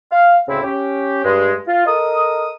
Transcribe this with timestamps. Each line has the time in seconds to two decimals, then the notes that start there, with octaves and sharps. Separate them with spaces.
0.11 F5
0.48 D2 A2 C#3 C4 E4
0.63 C#4 G4
1.25 G2 G#3
1.67 F4
1.86 A4 A#4 D#5 D#6